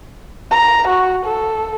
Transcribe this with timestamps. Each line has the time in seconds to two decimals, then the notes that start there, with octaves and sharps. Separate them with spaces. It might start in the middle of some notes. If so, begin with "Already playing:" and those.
0.51 A#5
0.88 F#4
1.26 A4